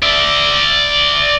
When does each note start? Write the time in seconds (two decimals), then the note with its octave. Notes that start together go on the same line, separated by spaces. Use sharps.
0.03 D5 E5